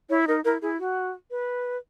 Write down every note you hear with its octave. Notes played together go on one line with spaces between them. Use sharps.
E4 C#5
D#4 A#4
E4 A#4
E4 G#4
F#4
B4